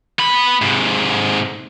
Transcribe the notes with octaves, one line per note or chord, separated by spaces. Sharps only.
B3 B5
G#2 C3